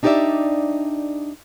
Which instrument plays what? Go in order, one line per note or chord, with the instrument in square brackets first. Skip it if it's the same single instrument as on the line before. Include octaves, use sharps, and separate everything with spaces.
[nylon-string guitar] D4 D#4 G4 C#5 D5 E5